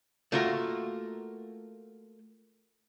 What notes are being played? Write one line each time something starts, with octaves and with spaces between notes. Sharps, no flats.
A3 A#3 F4 F#4 A#4